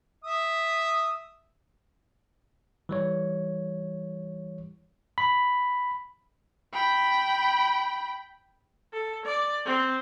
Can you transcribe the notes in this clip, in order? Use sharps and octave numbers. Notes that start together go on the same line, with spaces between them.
E5 D#6
E3 G3 C#5
B5
G5 B5
A4
D5
C4